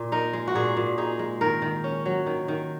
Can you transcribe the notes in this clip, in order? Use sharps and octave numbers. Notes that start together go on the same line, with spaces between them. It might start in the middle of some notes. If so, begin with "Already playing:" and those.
Already playing: A#2
D#4 A#4
G#3
F#4
A#2 G#4
A#2
D#4 G#4
G#3
D#3 A#4
D#3
C#4
F#3
D#3
D#3